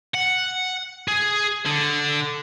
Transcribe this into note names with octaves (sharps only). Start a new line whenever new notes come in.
F#5
G#4
D3